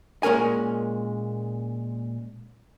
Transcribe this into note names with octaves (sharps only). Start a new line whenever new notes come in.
A#2 G#3 C#4 A#4 G#5